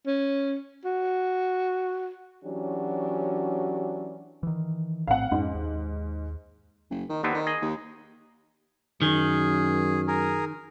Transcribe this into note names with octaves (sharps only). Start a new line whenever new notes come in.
C#4
F#4
E3 F#3 C#4 D4 F#4 G4
D#3 E3
A#1 A2 C4 F5 F#5
F2 G#2 C#4
D#2
F#1
D#3
D#2 D3 B3 C4
D#3
G#4 D#5
D#2
F#2 D#3 G#4
G#4 A#4